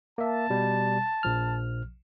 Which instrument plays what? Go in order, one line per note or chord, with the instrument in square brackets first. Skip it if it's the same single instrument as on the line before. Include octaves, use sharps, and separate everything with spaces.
[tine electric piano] A#3 E5 [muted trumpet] A5
[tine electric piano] B2 G3
A#1 F3 F6